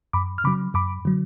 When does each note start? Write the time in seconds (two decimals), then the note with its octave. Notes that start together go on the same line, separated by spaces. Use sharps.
0.13 F#2 B5 D6
0.38 F6
0.44 C#3 F#3 B5 D6
0.74 F#2 B5 D6
1.05 D3 F#3